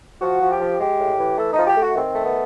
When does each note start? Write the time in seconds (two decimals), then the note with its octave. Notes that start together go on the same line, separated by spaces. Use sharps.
0.21 F3 F#4
0.41 F3
0.50 G4
0.60 F3
0.80 G#3 G4
1.00 A2
1.18 E3
1.38 A3 A4
1.53 F3 D#4
1.67 G4
1.77 A3 F#4
1.96 D#3 C4
2.15 A3
2.25 B3